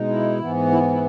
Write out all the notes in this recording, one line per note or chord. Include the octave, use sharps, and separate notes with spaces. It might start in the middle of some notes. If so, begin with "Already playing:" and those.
Already playing: B2 G#3 D#4
E4
G#2 E3 B3
E4
E4